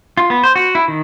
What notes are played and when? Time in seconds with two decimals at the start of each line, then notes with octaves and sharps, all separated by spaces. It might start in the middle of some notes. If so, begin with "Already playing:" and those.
0.17 F4
0.30 B3
0.44 C5
0.56 F#4
0.75 E4
0.88 D#3